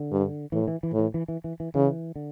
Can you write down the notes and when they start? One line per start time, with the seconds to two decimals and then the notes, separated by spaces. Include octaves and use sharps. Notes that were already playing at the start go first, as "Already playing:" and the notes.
Already playing: D3
0.12 G2
0.52 A2 E3
0.68 E3
0.83 E3
0.93 A2
0.99 E3
1.14 E3
1.28 E3
1.44 E3
1.60 E3
1.75 C#3 E3
2.16 D3